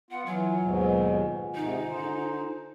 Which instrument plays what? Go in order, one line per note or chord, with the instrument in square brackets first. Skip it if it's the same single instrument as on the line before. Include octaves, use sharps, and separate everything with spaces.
[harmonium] B3 F4 [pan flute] F#5
[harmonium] E3 [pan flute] F#3 [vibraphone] F4 F#5 G#5
[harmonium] D#2 G#2 B2
[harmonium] G#2 C3 D#3 [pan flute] D#4
[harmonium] D3 C5